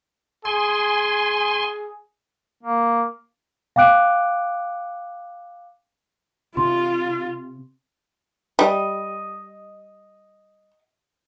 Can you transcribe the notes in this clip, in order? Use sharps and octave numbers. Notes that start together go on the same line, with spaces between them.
G#4 G#5 C6
A#3
F5 G5 D6 F#6 D7
C3 F4 C6
G3 D#5